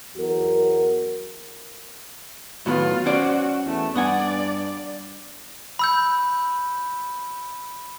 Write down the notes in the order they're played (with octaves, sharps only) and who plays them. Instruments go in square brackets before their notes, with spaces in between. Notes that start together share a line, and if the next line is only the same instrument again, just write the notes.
[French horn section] E2 F#3 F#4 A#4
[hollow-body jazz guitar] A2 D#3 B3 [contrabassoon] F#3 [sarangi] F4
[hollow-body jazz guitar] C#4 C5 D5 [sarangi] F#4
[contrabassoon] E2 [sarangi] A3
[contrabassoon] G2 [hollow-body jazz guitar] B3 F#5 G#5 [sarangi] D5
[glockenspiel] B5 E6 G6